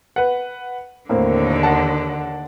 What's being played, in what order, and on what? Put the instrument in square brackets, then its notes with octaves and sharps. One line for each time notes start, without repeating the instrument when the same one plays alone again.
[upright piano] B4 F#5
[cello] D#2 D3 [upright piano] A2 A#3 C4
[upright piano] F#5 A5